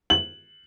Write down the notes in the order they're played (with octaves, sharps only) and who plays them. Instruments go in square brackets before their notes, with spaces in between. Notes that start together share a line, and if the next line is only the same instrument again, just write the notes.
[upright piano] F#7